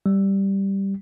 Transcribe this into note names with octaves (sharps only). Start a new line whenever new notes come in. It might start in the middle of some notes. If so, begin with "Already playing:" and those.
G3